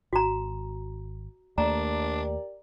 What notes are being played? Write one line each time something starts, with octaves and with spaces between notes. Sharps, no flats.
G#1 F#4 A#5
D#2 A3 A#3 D4 G4 A#4 D5 A#5